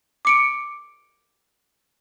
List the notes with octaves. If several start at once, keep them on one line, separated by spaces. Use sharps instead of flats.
D6 C#7 D7